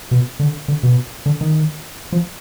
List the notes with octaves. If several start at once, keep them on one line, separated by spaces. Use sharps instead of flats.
B2
D3
D3
B2
D3
D#3
F3